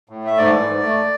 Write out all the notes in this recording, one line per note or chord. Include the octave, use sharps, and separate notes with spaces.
A2
A3 E5
G#2 D5
E3
G#2
A3